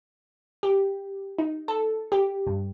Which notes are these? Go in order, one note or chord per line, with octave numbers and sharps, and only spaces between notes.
G4
D#4
A4
G4
G2